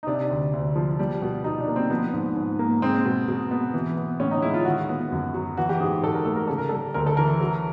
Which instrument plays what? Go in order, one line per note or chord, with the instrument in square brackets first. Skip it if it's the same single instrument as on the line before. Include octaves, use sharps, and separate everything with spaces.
[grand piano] D#4
C3 D4
D2
D2
F3
G3
B2
B2 D#4
D4
A#3
C4
F3 B3
G#2
G#2
A#3
G#3 C4
B2
B2
B3
E3
B3
A2 C#4
D#4
G#3 E4
F4
D#3 F#4
B3
F#2
F#3
E3 F#4
G4
G#2 G#4
G#2 A4
A#4
A3 A4
A#4
C#3 A4
A#4
G3 A4
D2 A#4
A4
E3 A#4
F#3